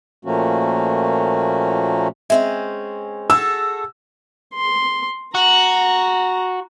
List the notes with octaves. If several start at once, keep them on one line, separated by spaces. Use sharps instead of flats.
A#2 F3 A3 A#3 C#4 F#4
G#3 C4 C#4 E5
F#4 G#4 A4 E6
C6
F#4 A#5